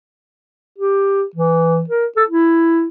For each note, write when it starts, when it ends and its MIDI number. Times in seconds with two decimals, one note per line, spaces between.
0.78 1.24 67
1.35 1.83 52
1.89 2.06 70
2.17 2.24 69
2.29 2.88 64